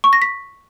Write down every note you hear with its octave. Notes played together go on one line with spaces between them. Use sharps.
C#6
A#6
B6